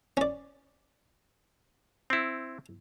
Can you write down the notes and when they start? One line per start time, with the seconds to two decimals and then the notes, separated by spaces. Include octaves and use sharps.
0.17 C#4 D5
2.10 C4 E4